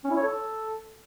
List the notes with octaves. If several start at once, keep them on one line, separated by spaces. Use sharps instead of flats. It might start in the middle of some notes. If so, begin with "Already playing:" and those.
C#4
E4
C#5
A4